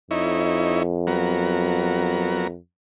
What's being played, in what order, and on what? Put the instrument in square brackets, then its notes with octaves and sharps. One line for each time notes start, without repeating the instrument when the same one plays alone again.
[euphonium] F2 [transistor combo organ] D#4 E4 C#5
[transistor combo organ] F#3 B3 A#4